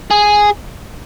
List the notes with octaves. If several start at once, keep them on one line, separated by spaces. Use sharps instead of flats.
G#4